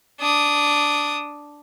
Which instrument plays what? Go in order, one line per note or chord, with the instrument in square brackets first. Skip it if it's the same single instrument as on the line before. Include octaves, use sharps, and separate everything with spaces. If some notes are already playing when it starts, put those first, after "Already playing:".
[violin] D4 D#6